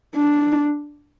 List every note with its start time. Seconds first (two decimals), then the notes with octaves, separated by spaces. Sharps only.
0.16 D4